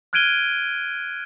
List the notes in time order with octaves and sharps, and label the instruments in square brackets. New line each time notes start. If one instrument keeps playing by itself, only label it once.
[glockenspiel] F6 F#6 G#6 D7 D#7 G7